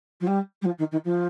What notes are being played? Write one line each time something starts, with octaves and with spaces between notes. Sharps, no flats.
F3
G3
G3
F3
D#3
D#3
F3